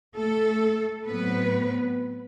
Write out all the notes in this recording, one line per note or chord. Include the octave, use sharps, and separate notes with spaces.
A3 A4
A2 F#3 B3 C4 B4